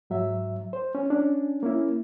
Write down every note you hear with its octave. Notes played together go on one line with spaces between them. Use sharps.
G#2 F#3 E5
C5
C#4
C#4 D4
A#3 C#4 E4